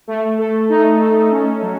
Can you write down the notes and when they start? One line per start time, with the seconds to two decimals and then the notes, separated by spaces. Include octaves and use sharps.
0.08 A3
0.38 A4
0.69 D#4
1.00 A4
1.31 C#4
1.62 F#3